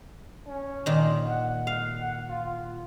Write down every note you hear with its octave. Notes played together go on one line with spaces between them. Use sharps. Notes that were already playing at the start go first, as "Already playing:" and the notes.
C#4
A#2 D#3
F#5
F5
F#5
F4